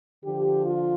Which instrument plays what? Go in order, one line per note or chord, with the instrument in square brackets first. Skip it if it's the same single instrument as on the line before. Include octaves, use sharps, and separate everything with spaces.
[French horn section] D3 F3 G4
F4